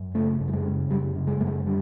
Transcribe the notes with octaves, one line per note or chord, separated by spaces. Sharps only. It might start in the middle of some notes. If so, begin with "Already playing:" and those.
Already playing: F#2
C#3 A3
F#2
G3
G#3
C#3
F#2 G3
C#3
G#3
F#2 A3
G#3
D3 G3